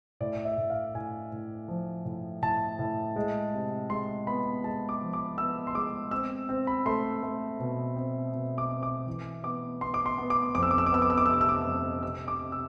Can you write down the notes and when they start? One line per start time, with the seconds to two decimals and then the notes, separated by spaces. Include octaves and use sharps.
0.20 A2 D5
0.45 E5
0.57 A2
0.70 F5
0.95 A2 G#5
1.32 A2
1.68 F3
2.05 A2
2.42 A2 A5
2.79 A2
3.16 G#3
3.53 C3
3.90 G#3 C6
4.27 B3 B5
4.64 G#3 A5
4.89 D6
5.01 F3
5.13 D6
5.38 B3 E6
5.67 C6
5.75 G#3 D6
6.11 C4 E6
6.49 C4
6.67 B5
6.86 A3 C6
7.23 A3
7.60 B2
7.96 C4
8.34 B2
8.58 D6
8.70 C4
8.83 D6
9.07 E3
9.44 B3 D6
9.81 B3 C6
9.94 D6
10.06 C6
10.18 B3
10.30 D6
10.55 F2 D6
10.63 E6
10.71 D6
10.78 E6
10.86 D6
10.92 B3 E6
11.02 D6
11.10 E6
11.18 D6
11.26 E6
11.29 C3 D6
11.41 E6
11.49 D6
11.66 F2
12.03 C3 E6
12.28 D6
12.39 C3
12.52 E6